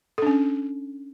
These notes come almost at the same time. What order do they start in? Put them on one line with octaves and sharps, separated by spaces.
A4 D4 C#4